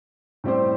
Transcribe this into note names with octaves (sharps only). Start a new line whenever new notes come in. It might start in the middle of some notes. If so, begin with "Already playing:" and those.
A2 G3 C4 G4 C5